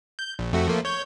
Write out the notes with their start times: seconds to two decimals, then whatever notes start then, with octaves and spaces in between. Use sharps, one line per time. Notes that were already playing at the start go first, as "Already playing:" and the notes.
0.19 G6
0.39 A#1
0.53 F2 A3 F#4
0.68 F3 A3 A#3
0.85 C#5 G6